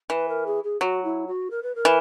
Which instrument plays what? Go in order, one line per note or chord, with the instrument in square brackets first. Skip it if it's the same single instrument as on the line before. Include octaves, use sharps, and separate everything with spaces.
[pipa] E3 [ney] B4
[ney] A#4
G#4
G#4
[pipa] F#3 [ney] F#4
[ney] E4
F#4
A#4
B4
A#4
[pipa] E3